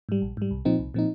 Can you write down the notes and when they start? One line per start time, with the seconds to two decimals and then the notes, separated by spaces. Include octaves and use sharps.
0.09 G#2 G3
0.22 A#1
0.37 G#2 G3
0.51 C2
0.65 A#2 F3 C4 D#4
0.79 C2
0.94 A#2 F3 C4 D#4